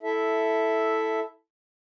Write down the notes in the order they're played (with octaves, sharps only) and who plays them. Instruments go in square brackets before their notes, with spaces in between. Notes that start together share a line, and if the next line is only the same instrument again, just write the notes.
[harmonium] E4 A4 E5